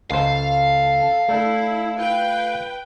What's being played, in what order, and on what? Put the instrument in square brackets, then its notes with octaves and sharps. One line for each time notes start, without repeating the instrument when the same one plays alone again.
[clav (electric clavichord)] C#2 C5 [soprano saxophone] A4 [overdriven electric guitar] F5
[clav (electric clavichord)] A3 A4 [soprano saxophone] D4 [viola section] E4
[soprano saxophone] F4 [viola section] B4 G5